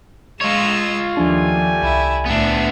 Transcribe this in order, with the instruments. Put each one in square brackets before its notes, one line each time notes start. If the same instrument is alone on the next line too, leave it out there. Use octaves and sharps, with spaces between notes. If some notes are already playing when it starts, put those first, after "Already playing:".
[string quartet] G#3 D#5 E6 [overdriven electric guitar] F4 C#5
[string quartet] D#2 [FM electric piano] F3 D4 [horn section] G3 A3 G#5
[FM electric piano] C2 [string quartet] E4
[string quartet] D2 A2 E5 [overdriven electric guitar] B3 D4